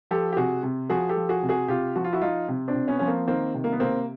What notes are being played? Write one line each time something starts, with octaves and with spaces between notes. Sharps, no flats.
F3 G4 A4
G4
C3 F#4 G#4
C3
F3 F#4 G#4
G4 A4
F3
F#4 G#4
C3
F#4 G#4
C3 F4 G4
F3 F#4
F4
E4 F#4
F3 D#4 F4
C3
C4 D4
C3
B3 C#4
F3 C#4
A#3 C4
D#3 A#3 C4
C3
A#3
B3
C3 A#3 C4